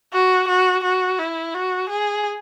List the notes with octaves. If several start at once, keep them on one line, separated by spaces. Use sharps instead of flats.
F#4
F#4
F#4
E4
F#4
G#4